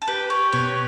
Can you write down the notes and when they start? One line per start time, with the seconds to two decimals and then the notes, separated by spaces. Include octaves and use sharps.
0.02 A4
0.08 G4 B4
0.30 G4 C#5
0.52 B2 C#5